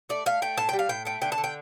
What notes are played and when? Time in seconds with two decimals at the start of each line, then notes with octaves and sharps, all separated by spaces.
0.09 A3 D5
0.26 A3 F5
0.42 A3 G5
0.58 A2 A5
0.69 G3 G5
0.79 F5
0.89 A2 G5
1.05 A3 G5
1.22 D3 G5
1.32 A5
1.38 D3
1.44 G5